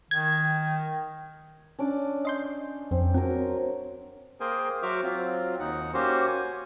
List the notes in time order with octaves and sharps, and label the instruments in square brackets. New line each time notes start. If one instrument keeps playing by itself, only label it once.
[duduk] D#3 [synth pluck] G#6
[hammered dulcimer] C#4 D4 D6
[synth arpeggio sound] D#5 C6 G6
[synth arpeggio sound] F2 [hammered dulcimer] C4
[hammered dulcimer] F#3 A#4 [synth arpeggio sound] C4
[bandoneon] A#3 G#4 A#4 C5 G5 G#5
F#3 F#4 C5 E5 D6 F6
F#3 C4 F4
D#2 D#4 F#5
A#3 C#4 F#4 G4 C5
G#5